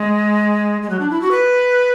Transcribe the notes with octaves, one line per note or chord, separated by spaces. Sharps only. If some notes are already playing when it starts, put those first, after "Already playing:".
Already playing: G#3
G#3
F#3
D4
E4
F#4
B4